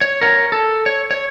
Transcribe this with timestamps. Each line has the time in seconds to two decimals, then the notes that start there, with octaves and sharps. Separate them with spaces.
0.01 C#5
0.21 A#4 C#5
0.52 A4
0.86 C#5
1.11 C#5